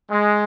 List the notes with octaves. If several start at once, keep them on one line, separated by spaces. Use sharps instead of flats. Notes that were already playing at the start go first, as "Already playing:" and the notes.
G#3